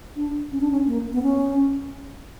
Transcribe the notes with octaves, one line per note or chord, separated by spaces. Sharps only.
D4
C#4
D4
C#4
A#3
B3
C#4